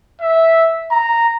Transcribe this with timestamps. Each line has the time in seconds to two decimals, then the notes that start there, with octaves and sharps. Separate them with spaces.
0.21 E5
0.91 A#5